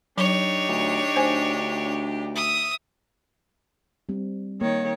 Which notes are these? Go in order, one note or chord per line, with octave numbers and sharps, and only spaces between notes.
F#3 D4 D#4 G4 C#5
D2
D2 C5 G5 G#5
E5 D#6
G3 C4
D#3 A#3 C#5